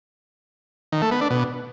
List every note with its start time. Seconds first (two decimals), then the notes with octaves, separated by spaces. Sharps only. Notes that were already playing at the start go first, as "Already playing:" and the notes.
0.92 D#3
1.02 A3
1.11 B3
1.21 D4
1.30 B2